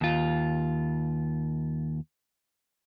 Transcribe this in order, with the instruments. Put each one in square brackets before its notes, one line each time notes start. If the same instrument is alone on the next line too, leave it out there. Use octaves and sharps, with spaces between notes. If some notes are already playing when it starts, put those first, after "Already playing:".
[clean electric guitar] D#2 F4